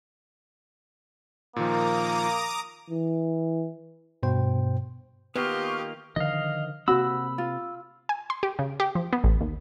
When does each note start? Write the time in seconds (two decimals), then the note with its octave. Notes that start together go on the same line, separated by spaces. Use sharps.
1.56 A#2 D#3 F3 A#3 A#5 D6 D#6
2.90 E3
4.23 G2 B2 C5 G5
5.36 D#3 A#3 B3 F4 G4 C#6 D#6 F6
6.16 D3 D#3 F3 D#5 F5
6.88 C3 A#3 C4 F#4 B5 E6
7.38 F4
8.09 G#5
8.30 C6
8.43 G4
8.59 C#3
8.80 G4
8.95 F3
9.13 B3
9.24 A1
9.41 D#2